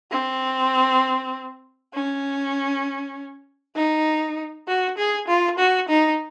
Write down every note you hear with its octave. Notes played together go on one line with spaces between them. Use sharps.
C4
C#4
D#4
F#4
G#4
F4
F#4
D#4